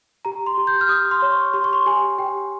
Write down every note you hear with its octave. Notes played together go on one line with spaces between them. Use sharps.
G4 A#5
C6
G4
G6
F6
G4 D#6
C6
C#5
C#6
G4 C6
C#6
C6
G4 G#5
G4 G5